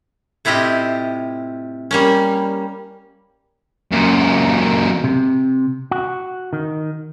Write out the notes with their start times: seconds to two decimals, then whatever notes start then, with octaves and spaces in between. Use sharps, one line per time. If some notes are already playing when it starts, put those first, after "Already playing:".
0.45 A2 C3 E4 F4 G4 D#5
1.91 G3 A#3 C#4
3.92 F#2 A#2
5.04 C3
5.91 F#4
6.53 D#3